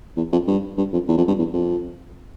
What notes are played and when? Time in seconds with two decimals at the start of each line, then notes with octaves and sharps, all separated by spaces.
0.17 E2
0.32 F2
0.48 G2
0.78 G2
0.93 F2
1.08 E2
1.17 F2
1.27 G2
1.38 E2
1.53 F2